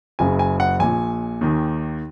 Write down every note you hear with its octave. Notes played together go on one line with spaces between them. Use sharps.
F#1 F#2 C#3 G#5
G#5
F#5
A#1 A#2 G#5
D#2 D#3